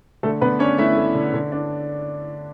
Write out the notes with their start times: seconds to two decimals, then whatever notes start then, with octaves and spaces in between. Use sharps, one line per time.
0.23 D3 A3 A4
0.41 D3 B3 B4
0.59 C#4 D4 C#5
0.78 A3 E4 E5
0.97 A3
1.15 D3
1.34 D3
1.52 D4